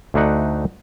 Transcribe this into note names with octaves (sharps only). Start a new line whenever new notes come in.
D2 A3 D4 D#4 F#5